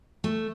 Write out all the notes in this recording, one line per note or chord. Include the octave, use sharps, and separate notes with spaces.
A3